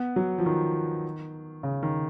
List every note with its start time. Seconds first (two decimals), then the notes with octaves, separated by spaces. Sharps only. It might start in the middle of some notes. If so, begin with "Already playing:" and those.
Already playing: B3
0.16 F#3
0.38 F3
0.46 D#3
1.63 C#3
1.83 D#3